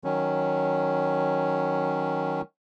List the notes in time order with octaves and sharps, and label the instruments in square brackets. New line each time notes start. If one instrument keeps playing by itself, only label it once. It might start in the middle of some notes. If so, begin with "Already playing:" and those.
[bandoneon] D#3 F#3 C#4